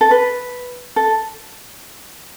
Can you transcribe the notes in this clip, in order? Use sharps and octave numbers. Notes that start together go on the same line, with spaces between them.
A4
B4
A4